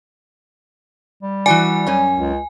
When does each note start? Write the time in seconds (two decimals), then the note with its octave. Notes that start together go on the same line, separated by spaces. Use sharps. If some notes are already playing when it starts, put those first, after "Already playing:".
1.23 G3
1.46 E3 F#4 D5 G#5
1.87 F#2 C#4
2.15 C#2